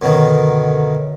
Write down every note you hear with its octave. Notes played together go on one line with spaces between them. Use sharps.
F#2 B2 D3 D#3